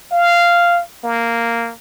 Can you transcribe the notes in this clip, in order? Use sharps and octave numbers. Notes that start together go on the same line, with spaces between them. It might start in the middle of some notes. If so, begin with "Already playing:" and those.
F5
A#3